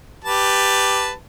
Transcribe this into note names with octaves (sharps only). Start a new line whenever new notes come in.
G4 B4 A5